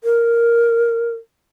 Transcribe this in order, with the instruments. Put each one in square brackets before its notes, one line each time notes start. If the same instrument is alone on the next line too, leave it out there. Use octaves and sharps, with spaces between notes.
[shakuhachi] A#4